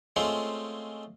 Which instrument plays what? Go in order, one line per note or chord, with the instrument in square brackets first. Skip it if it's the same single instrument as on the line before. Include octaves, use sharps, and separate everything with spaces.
[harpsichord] G#3 A3 C4 C#4 F4 C5